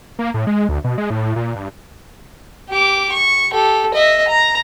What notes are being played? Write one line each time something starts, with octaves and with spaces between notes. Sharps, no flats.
A#3
A2
G#3
D2
B2
G#3
A2
A#2
G2
G4 D6
C#6
G4 A4
D#5 E5
A#5